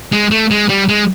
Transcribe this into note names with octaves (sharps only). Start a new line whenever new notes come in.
G#3
A3
G#3
G3
G#3